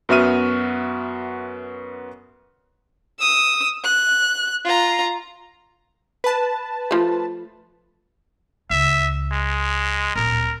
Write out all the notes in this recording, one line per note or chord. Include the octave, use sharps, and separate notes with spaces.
F#2 B3 F#4 E5 F6 D#7
D#6 E6
F#6
F4 A#5
B4 A5
F3 A3
C#2 E5
G#3
D1 A#1 A#4